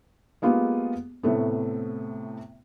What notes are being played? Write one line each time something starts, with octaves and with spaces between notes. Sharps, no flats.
G#3 A#3 B3 F4 G4 G#4
A2 C3 A3 B3